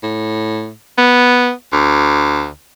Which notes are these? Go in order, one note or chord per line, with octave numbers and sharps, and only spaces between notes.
A2
B3
D2